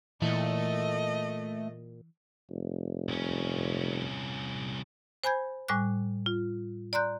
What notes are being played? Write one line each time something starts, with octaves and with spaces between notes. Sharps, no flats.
A#2 E3 A3 D#5
F1
C2 C#4
C5 G#5 B5 G6 G#6
A2 G3 G#5 D6 F#6
F4
D5 A#5 C6 F#6 G6